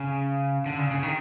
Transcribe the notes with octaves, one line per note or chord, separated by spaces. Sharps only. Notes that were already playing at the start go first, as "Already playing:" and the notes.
Already playing: C#3
D3
C#3
C#3
D#3